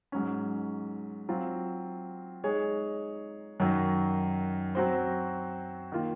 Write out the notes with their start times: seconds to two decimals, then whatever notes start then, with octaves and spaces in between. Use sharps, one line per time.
0.12 G#2 F#3 C#4
1.29 F#3 C4 F4
2.44 G#3 D#4 G#4 C#5
3.60 F#2 D#3 F#3
4.75 F#3 C4 F#4 C5
5.92 D#3 A#3 F4